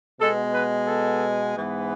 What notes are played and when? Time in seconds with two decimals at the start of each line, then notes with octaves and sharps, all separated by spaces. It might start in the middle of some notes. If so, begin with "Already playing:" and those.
0.19 B2 G#3 B3 A4
0.54 B4
0.87 A4
1.55 G#2 E3 G#3 B3